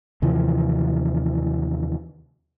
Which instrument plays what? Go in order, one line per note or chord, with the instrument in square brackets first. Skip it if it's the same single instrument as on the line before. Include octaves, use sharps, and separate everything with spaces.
[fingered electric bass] D#2 C3 E3 F3